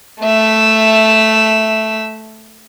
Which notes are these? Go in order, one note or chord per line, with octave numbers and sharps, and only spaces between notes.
A3 E5